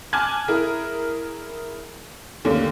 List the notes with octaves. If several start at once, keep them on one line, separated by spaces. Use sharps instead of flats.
G#5 A5 D6 F6 F#6 G#6
E4 G#4 A#4
D#2 D3 A3 A#3 C#4